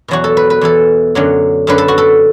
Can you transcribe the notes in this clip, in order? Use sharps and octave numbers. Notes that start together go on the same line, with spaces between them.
E2 B2 F#3 F#4
A4
B4
B4
E2 E3 A4
F#2 D3 F#3
F#2 D3 F#3 B4
A4
F#4
A4